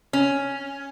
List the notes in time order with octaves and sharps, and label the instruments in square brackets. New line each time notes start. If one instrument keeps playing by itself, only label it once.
[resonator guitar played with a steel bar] C#4